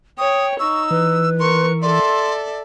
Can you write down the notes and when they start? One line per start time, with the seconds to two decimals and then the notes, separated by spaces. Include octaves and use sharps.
0.18 C#5 G5 D#6
0.59 D#4 C#6 E6
0.91 E3 B4
1.40 A#4 C6 C#6
1.82 A4 D5 E5 C6